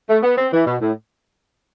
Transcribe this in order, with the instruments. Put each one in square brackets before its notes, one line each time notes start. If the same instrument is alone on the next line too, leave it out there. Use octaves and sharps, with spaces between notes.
[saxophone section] A3
B3
C4
E3
B2
A2